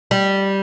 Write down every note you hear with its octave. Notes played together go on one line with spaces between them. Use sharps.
G3